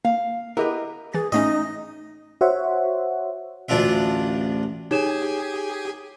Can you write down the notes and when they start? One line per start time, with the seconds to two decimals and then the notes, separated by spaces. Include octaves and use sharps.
0.05 A#3 F5
0.57 B3 E4 G4 G#4 A#4 B4 D#5
1.14 E3 G#4 A6
1.32 A2 A3 C#4 D#4 D#5
2.41 F#4 C5 C#5 E5 F#5
3.69 A1 D2 D4 F4 E5
4.91 D#4 G4 G#4 C#5 G#5 E7